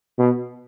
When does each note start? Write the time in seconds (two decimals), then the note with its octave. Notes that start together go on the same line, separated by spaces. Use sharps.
0.19 B2